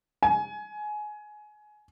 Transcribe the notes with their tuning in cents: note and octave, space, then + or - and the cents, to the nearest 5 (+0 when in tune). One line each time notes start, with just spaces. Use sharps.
G#5 +20